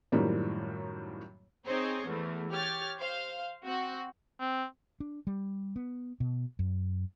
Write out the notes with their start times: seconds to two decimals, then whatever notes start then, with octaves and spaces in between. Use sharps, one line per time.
0.12 F#2 A2 D#3 F3 G3 A#3
1.67 C4 D#4 G#4 C5 C#5
2.07 E2 E3 A3
2.50 G4 C#5 F6 A6
2.98 C5 F5
3.65 C4 F#4
4.41 C4
5.00 D4
5.27 G3
5.76 B3
6.20 B2
6.59 F#2